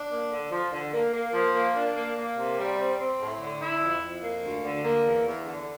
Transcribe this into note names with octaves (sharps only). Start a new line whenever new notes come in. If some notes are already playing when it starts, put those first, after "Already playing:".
Already playing: D4
A#3
D3
F3
D3
A#3
A#3
F3
A#3
D4
A#3
A#3
C3
G3
C4
C4
A2
D3
E4
F2
F2
A#3
D2
D3
A#3
E2
E2
D3